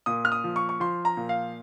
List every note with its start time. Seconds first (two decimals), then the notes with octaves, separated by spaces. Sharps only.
0.06 A#2 D#6
0.25 F6
0.32 D#6
0.44 F3
0.56 C#6
0.69 C#6
0.80 F3 C6
1.05 A#5
1.17 A#2
1.29 F5